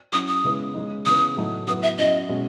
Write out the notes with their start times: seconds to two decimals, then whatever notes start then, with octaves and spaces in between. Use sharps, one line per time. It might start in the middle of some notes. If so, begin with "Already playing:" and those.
0.12 F#3 C#4 E4 D#6
0.28 D#6
0.44 C#3 G#3 B3 E4
0.74 C#3 G#3 D#4
1.06 C#3 E3 B3 D#6
1.36 A2 F#3 A3 D#4
1.67 F#3 B3 E4 D#6
1.83 E5
1.98 F#3 C#4 E4 D#5
2.29 B2 G#3 C#4